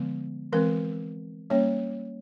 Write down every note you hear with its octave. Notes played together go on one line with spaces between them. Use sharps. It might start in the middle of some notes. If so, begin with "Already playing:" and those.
Already playing: D3 F3 G#3 B3
E3 G#3 C4 A#4
G3 A#3 C#4 C#5